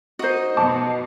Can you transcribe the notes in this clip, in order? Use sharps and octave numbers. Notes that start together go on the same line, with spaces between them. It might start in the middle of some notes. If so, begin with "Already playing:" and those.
D#4 F#4 C5 D#5
B2 A5 D6